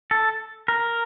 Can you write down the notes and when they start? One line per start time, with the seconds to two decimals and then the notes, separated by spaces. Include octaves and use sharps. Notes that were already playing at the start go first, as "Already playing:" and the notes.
0.11 A4
0.68 A#4